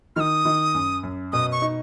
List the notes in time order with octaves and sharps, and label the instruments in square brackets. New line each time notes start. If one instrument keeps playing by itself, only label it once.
[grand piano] D#3 [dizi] D#6 F6
[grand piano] D#3
F#2
F#2
[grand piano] B2 [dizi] D#6
[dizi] C#6
[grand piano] D#4